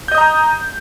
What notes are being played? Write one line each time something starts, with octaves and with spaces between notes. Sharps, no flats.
D#5 A#5 D#6 G6